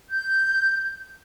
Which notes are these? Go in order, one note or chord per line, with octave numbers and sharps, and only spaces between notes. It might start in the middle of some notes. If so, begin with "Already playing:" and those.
G6